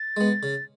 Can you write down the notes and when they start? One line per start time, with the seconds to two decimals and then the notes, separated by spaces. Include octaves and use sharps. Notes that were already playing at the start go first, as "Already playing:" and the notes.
Already playing: A6
0.17 G#3 B3
0.43 C#3